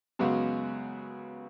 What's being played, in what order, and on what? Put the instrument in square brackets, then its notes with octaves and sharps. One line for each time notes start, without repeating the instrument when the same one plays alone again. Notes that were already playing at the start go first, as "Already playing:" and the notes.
[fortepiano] F#2 C#3 G#3 B3 F#4